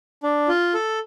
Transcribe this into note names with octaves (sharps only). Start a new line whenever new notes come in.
D4
F4
A4